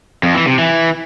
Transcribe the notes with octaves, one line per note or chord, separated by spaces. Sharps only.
F2
E3
C3
E3